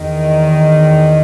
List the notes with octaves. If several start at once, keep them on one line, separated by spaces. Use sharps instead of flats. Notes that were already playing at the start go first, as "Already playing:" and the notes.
Already playing: E2 D#3